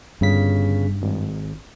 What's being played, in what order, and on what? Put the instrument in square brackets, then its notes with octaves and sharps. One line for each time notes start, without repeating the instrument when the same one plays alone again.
[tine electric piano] G1 C#3 B6 [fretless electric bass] G2
[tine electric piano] G#1